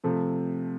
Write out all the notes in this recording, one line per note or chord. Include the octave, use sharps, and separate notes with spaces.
C3 F3 A3